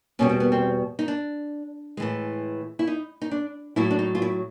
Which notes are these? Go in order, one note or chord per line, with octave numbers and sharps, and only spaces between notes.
E2 B2 G3 C#4
C4
B3
C4
D#4
D4
A2 E3 G#3
E4
D#4
D#4
D4
A2 F#3 E4
D4
D#4
F4
E4